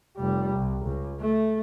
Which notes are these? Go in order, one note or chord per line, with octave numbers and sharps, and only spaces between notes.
F1 G3
C2
C#2
A3